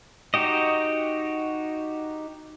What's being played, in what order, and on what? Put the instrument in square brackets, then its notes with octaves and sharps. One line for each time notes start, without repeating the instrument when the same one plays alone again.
[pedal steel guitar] D#4 F#4 G4 D#5